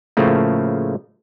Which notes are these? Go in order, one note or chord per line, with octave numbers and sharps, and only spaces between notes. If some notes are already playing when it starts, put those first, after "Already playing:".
A2 C#3 F3 A3 A#3